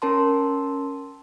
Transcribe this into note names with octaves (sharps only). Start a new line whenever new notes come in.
C#4 A#4 A5 C6